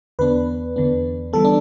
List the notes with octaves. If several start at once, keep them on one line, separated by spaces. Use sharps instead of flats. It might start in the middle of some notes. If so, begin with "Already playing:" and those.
E2 D3 B3 D4 B4
E2 D3 B3 D4
E3 G3 B3 A4
D4